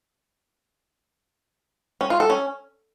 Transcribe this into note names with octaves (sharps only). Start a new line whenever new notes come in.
C#4
F4
A4
C#4